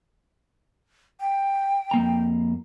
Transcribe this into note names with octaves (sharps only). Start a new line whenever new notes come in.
G5
F2 A#3 A#5